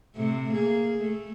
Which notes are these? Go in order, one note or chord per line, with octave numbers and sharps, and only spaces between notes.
A2 C3 A3
A#3 G#4
A3